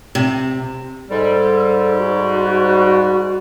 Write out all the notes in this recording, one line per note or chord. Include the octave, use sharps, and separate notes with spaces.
C3
G#2 G3 A4
F#4